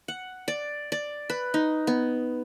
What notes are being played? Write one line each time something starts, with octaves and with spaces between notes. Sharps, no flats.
F#5
D5
D5
B4
D#4
B3